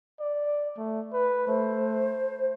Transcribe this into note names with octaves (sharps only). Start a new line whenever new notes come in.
D5
A3
B4
A3 C5